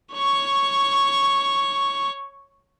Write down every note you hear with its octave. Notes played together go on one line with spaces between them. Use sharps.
C#5 C#6